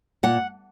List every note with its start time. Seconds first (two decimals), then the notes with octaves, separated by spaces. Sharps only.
0.23 A#2 F#5